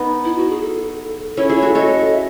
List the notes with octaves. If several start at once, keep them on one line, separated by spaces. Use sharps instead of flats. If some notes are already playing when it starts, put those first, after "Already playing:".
Already playing: B3 D#4
E4
F#4
G#4
A4
C#4 E4 A4
E4 G#4
C#5
F#4 A4
A4 C#5 D#5
E5